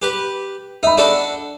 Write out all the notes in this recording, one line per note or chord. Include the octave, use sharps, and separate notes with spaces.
G4 B4
D#4 E5 B5
D4 F#4 A4